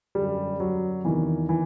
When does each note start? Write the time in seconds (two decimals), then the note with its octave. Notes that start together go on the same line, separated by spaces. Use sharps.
0.15 F#2 D3 G3
0.60 F#3
1.04 E2 C3 D#3 E3
1.49 E3